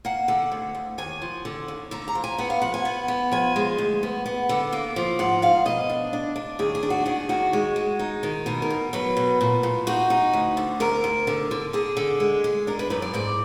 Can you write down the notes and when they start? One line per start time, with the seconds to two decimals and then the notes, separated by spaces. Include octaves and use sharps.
0.05 A#3 F#5
0.28 D3
0.52 D2
0.75 D2
0.98 D#2 G#5
1.22 F3
1.45 D3
1.68 D#2
1.91 D3 A#5
2.08 A#5
2.15 F3
2.24 G#5
2.38 B3 F#5
2.50 F5
2.62 F3 F#5
2.74 G#5
2.85 B3
3.08 B3
3.32 F3 G#5
3.56 G#3
3.78 D2
4.03 B3
4.26 B3
4.49 D3
4.73 A#3
4.96 F3
5.19 G#2 F#5
5.42 G#2 F5
5.66 B2 D#5
5.90 D4
6.13 D4
6.36 D4
6.59 D#2 G#4
6.75 G#4
6.83 D4
6.90 F#4
7.06 D#3 G#4
7.29 D#2 F#4
7.53 G#3
7.76 G#3
7.99 D#4
8.23 D#3
8.46 B2 D#4
8.62 A#4
8.70 B2
8.93 F#3 B4
9.17 B2
9.41 A#2
9.63 A#2
9.87 D#4 F#4
10.10 D#4
10.33 D2
10.57 D3
10.80 D2 A#4
11.04 D2
11.27 D3
11.51 D3
11.73 D3 G#4
11.97 D3
12.20 G#3
12.44 G#3
12.67 D4 A#4
12.79 B4
12.90 F#2 B4
13.02 D5
13.14 G#2 D5